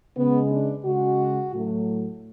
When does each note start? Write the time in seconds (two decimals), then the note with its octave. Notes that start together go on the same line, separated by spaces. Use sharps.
0.17 C#3 G#3 B3
0.51 D4
0.85 C#3 G#3 F#4
1.53 A2 F#3 A3